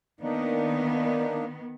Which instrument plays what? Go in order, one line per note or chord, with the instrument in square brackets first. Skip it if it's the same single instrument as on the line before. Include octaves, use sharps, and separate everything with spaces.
[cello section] D#3 B3 [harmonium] A#3 D4 D#4